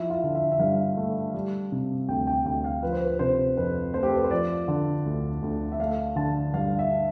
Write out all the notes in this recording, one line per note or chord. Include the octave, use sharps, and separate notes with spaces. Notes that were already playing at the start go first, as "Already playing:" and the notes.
Already playing: F3 E4
F4
D3
E5
E5
G2 F5
A3
G3
C3
D2 G5
G5
D2 G5
F5
F3 B4
C5
B4
C3 C5
F2 B4
A3 C5
G4
A4
B4
C5
F3 D5
D3
D2
D2
E5
A3 F5
D3 A5
G2 F5
E5